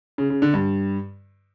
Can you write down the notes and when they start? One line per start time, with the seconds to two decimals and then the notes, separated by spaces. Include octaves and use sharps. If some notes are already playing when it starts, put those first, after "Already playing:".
0.18 C#3
0.30 C#3
0.42 D3
0.54 G2